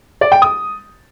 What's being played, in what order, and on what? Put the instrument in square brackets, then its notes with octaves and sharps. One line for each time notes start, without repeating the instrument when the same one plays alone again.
[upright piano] D5
G5
D#6